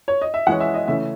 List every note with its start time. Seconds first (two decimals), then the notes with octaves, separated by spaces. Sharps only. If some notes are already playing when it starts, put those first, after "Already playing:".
0.08 C#5
0.22 D#5
0.34 E5
0.47 E3 G#3 C#4 F#5
0.60 E5
0.74 D#5
0.88 C#3 E3 A3 C#4 E5